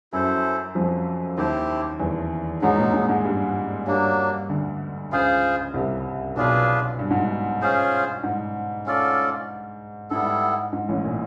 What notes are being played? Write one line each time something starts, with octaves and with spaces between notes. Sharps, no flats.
F#2 F#3 E4 A4 C5
F2 F3
D#2 D#3 E4 G4 C5
E2 E3
G#2 F#3 G#3 B3 D#4
A#2 A#3
G#2 G#3
G#2 G#3
G2 G3
G2 F#3 G3 A#3 D4
D2 D3
C#2 C#3 F4 G#4 C5
C2 C3
B1 B2 D4 F4 G#4 B4
G2
G#2
G2
C#4 F4 G#4 C5
G#2
C#4 F4 A4 D5
G#2 G3 B3 E4 A4
G#2
A1 A2
A#2